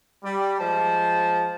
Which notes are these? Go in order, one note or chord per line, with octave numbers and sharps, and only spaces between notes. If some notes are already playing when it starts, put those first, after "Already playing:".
G3
F3 G#3 C5 A5